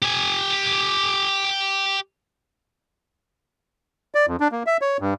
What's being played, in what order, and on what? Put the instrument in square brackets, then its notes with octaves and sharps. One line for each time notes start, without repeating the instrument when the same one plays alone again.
[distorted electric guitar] G4 G#5
[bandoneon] D5
F2
D4
A#3
E5
C#5
G2